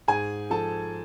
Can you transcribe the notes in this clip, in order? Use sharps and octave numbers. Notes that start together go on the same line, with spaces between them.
G#2 G#4 G#5
F3 A4 A5